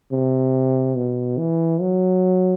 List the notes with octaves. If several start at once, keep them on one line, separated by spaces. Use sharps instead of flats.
C3
B2
E3
F#3